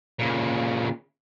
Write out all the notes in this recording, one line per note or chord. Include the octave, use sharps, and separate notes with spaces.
A#2 C#3